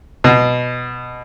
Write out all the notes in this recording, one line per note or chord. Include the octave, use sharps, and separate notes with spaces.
B2